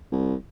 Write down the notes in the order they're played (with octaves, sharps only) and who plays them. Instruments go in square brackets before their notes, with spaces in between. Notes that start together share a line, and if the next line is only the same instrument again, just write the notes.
[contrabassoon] C2